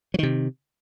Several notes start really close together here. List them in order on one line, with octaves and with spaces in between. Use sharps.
F#3 D#3 C3